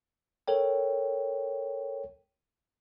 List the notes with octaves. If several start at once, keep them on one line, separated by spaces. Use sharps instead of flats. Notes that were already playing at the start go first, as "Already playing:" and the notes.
A4 A#4 C#5 G5